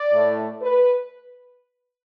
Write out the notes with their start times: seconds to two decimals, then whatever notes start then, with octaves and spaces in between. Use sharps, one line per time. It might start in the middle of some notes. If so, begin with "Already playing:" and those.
Already playing: D5
0.13 A2 A3
0.62 B4